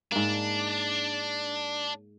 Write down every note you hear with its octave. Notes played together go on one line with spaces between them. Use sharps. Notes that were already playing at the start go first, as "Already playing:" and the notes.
G#2 A#3 D4